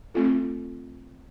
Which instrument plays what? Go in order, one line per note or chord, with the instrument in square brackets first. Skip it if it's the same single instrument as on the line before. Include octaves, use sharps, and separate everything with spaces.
[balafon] A3 C4 F4 A4